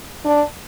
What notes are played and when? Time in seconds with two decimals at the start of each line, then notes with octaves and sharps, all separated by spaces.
0.25 D4